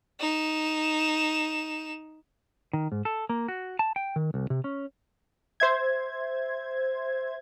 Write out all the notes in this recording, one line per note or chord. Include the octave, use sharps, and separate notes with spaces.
D#4 E7
D#3
G#2
A4
A#3
F#4
A5
G5
D#3
C2
C3
C#4
C5 E5 G#6